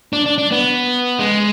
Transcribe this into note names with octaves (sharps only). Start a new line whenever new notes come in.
D4
D4
D4
B3
G#3